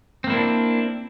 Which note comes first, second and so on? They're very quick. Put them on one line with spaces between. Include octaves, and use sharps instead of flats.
C4 A#3 E4 D4